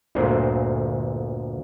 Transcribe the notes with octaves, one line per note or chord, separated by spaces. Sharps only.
G1 D2 A#2 C5